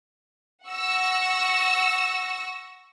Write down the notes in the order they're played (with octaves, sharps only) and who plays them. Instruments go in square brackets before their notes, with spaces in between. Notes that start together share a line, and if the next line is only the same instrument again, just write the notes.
[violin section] F#5 C#6 E6 A#6 C#7